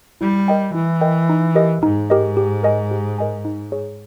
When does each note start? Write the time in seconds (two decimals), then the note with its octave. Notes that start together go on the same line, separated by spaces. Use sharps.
0.21 G3 E4
0.48 A#4 D#5 G5
0.74 E3 E4
1.01 A#4 D#5 G5
1.29 D#4
1.55 G4 A#4 D#5
1.83 G#2 D#4
2.10 G4 A#4 D#5
2.37 G4
2.63 A#4 D#5 G#5
2.91 G4
3.18 A#4 D#5 G#5
3.45 D#4
3.72 G#4 C#5